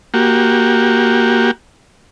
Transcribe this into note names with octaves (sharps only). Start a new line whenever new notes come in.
A#3 F#4 G4